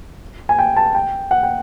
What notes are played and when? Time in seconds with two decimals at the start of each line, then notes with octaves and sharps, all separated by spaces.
0.49 G#5
0.59 G5
0.76 A5
0.95 G5
1.31 F#5
1.43 G5